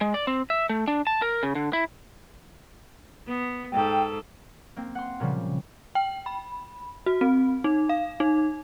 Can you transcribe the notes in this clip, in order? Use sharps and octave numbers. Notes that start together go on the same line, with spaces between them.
G#3
D5
C4
E5
A3
D4
A5
A#4
C#3
D3
E4
B3
G#2 A4 G5
A#3 C4
F#5 C6
A#2 C#3 F3 G3
G5
B5
F#4
C4
D#4
F5
D#4